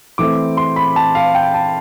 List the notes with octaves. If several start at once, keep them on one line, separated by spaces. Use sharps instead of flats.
E3 A3 C4 E4 D6
C6
B5
A5
F5
G5
A5